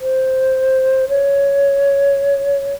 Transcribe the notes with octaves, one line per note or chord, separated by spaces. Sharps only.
C5
C#5